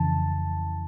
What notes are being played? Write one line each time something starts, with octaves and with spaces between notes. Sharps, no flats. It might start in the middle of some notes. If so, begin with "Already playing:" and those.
Already playing: F2 C#3 E3 A5